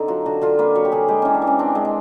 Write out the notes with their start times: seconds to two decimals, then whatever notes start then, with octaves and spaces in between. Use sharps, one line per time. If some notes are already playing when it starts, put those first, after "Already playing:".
Already playing: D3 C4 D#4
0.08 F#3 F4
0.26 D3 F#4
0.42 D3 F4
0.59 A#3 B4
0.75 F#3 C#5
0.85 G4
0.92 D3 G#4
1.08 G#3 G4
1.22 E3 C#4
1.34 D4
1.42 E3
1.47 C#4
1.59 C4 D4
1.75 G#3
1.85 D4